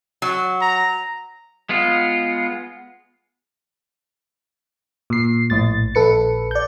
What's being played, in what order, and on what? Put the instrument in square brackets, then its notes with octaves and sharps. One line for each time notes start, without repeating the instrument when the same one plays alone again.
[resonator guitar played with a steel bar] F#3
[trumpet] A#5
[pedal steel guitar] G#3 B3 F4
[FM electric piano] A#2 C7
A#1 A2 A6
A#1 A4 B4 C#7
D5 G6